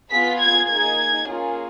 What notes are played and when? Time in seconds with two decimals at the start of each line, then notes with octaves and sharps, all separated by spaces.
0.11 B3 F4 G#4 B6
0.40 G#6
0.70 A#3 D#4 G#4 G#6
1.28 A#3 C#4 F4 G#4